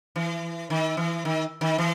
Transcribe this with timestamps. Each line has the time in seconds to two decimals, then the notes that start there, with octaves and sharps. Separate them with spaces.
0.16 E3
0.70 D#3
0.97 E3
1.25 D#3
1.61 D#3
1.78 E3